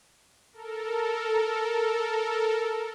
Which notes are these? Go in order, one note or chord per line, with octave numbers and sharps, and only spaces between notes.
A4 A#4